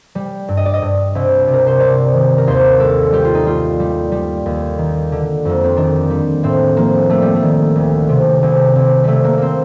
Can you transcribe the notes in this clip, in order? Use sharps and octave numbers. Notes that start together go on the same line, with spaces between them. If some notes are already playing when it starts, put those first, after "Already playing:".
G3
G2
D#5
D5
D#5
G2
C2
C3
A#4
C5
C2 D5
D#3
A#4
D#2 C5
G3 A4
G3 G4
F4
D#4
G3 F4
G3
G3
D#2
D#3
D3
F2 A#3
C4
D#3 D4
G3
A2 C4
F3 A#3
G3 A3
G3
A3
D#3
D2
C3
C2
C2
C2 G3 A3
A#3
A#3 C4